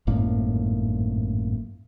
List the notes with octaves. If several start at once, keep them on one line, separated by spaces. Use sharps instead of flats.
G#1 F#2 A2 A#3